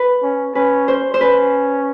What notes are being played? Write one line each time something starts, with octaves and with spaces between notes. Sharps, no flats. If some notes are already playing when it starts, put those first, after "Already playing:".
Already playing: B4
C#4
C#4 B4
C5
C5
C#4 B4